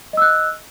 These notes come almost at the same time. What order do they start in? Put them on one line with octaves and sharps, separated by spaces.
D#5 E6 F#6